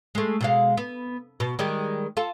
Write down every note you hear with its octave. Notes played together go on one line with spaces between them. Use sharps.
G#3 A3
B2 G#3 F5
B3
B2
D#3 G3 G#3
F4 A4